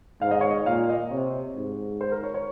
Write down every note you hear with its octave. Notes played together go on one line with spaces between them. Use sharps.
G#2 F5
D#5
C#5
D#5
A#2 F5
D#5
C3 C#5
G#2
C5
A#4
C#5
C#5